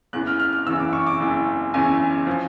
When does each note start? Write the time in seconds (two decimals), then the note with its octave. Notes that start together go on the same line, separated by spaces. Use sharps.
0.13 F#1 E2 C#3 E3 F#6
0.27 F6
0.40 F6
0.53 F6
0.67 F#1 E2 C#3 E3 E6
0.80 D6
0.93 C#6
1.07 D6
1.20 F#1 E2 C#3 E3
1.73 F#1 E2 C#3 E3 G#5
2.27 F3